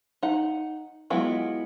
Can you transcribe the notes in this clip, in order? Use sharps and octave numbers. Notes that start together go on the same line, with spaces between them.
D#4 F#5
F#3 G#3 B3 E4 F4